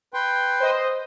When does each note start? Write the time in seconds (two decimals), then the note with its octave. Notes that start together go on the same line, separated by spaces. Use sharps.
0.14 B4 G5 C6
0.60 C5 D#5